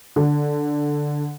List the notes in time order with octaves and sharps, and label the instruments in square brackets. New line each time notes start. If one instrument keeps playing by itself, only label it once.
[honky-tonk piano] D3